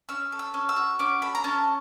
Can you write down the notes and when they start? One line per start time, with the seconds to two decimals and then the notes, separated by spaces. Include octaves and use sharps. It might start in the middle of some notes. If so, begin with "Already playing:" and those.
0.09 C#4 E6
0.32 A4
0.39 E6
0.54 C#4
0.69 E6
0.76 F#4
0.99 C#4 D6
1.22 A4 B5
1.35 A#5
1.44 C#4 A5